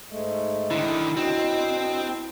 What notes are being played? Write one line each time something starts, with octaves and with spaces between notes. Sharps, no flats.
G#2 G#3 A3
D3 D#3 E4
A2 C4 D4 F#4 D#5